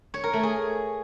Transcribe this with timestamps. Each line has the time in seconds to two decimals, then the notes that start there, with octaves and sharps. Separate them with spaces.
0.14 C#5
0.24 A#4
0.33 A3
0.43 G#4